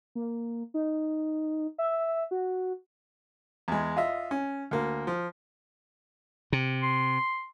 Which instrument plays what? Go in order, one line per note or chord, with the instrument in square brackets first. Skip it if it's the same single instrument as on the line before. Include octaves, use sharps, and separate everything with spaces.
[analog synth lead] A#3
D#4
E5
F#4
[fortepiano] E2 G#3
F4 D#5 E5
C#4
D2 A#3
F3
[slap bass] C3
[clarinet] C6